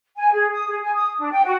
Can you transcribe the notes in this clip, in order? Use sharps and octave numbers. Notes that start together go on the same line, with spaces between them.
G#5
G#4
D#6
G#4
G#5
D#6
D4
G5
F#4